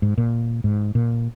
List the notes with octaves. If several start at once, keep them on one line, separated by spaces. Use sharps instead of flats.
G#2
A#2
G#2
A#2